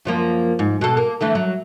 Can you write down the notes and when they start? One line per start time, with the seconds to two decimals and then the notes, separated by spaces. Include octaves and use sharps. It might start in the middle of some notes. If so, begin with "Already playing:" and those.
0.05 F#2 F3 A#3
0.59 G#2
0.81 B2 A4
0.97 A#3
1.21 D3 E3 A3
1.35 F#3